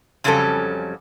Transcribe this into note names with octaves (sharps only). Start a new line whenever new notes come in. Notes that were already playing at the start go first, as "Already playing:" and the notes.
F2 C#3 F#3 G3 C#4 A4